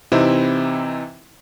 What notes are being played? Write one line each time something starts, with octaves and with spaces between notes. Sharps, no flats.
C3 E3 C4 D#4 E4